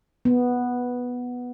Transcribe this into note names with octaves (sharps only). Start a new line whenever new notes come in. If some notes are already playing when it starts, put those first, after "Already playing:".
B3